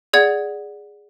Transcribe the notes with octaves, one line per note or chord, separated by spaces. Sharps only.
G#4 D5 F#5 G#6